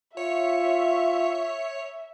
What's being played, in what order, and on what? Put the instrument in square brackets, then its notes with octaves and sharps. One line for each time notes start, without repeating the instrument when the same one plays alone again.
[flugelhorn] F4 [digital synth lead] C#5 [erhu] E5